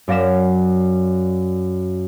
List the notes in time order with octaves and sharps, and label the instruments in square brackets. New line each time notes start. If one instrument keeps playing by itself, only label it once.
[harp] F#2 D5 F5 A#6 B6 E7